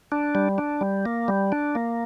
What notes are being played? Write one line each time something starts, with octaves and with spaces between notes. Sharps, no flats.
D4
G3
D4
G3
A#3
G3
D4
A#3